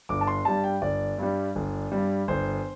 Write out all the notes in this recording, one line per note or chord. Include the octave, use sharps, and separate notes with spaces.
G1 D6
A5
C6
G2 G3 A5
G5
G1 D5
G2 G3
G1
G2 G3
G1 C5